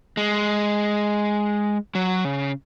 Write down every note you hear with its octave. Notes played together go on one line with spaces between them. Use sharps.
G#3
F#3
C#3